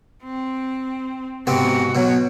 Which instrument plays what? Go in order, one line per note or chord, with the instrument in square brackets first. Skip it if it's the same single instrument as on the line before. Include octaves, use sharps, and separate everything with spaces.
[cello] C4
[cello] G#2 F#4 [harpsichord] C3 B3 C4
[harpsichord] B2 F#3